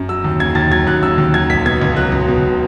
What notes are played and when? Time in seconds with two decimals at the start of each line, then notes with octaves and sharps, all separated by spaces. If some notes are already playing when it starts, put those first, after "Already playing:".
Already playing: F#2
0.09 F#3 E6
0.24 D#2
0.40 C#3 G#6
0.55 D#2 A6
0.71 F#3 G#6
0.87 D#2 F#6
1.03 C#3 E6
1.18 D#2
1.34 F#3 G#6
1.50 C#2 B6
1.65 B2 G#6
1.82 C#2
1.96 F#3 F#6
2.12 C#2
2.28 B2